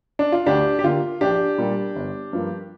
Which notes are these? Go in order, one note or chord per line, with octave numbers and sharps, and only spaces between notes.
D4
F4
D2 D4 G4
G4
D3 A#3 F4
A#1 D4 G4
A#2 G3 A#3
G1
G2 F3 A#3